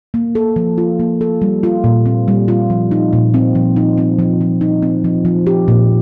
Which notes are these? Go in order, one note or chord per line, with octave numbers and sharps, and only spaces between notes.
A#3
A4
F3
F4
A#3
A4
G3
F4
A#2
C4
G3
F4
F3
D#4
A#2
C4
F3
D#4
C4
F3
F3
D#4
C4
F3
F3
G4
A#2